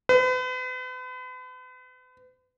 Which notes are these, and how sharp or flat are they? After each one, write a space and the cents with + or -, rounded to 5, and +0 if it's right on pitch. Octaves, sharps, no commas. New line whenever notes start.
B4 +40